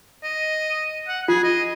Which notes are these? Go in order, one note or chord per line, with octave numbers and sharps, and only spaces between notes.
D#5
F#5
F4 G#4
D#5